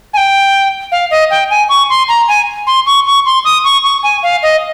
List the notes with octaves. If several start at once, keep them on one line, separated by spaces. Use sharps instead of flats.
G#5
G5
F5
D#5
G5
G#5
C#6
C6
A#5
G#5
C6
C#6
C#6
C6
D#6
C#6
C#6
G#5
F5
D#5